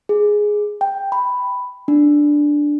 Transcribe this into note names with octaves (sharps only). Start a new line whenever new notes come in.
G#4
G5
B5
D4